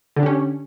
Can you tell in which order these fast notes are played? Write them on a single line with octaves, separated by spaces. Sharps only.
D3 D4 G4 C#4